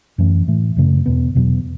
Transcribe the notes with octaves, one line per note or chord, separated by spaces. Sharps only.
F#2 E3 A3 C#4
A2 E3 A3
F#2 C#3 A3
E2 B2 B3
E2 B2 F#3 B3